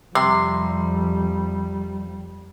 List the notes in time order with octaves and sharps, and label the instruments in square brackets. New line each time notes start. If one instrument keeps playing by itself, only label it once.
[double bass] F2 G3 [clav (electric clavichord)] C3 [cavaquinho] C6